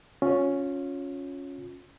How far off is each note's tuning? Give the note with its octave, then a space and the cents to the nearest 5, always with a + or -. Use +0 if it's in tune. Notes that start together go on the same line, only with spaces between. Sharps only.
C#4 +0 F4 +30